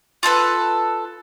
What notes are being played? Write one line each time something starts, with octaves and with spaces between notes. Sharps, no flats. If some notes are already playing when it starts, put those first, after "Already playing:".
F4 G#4 A4 B4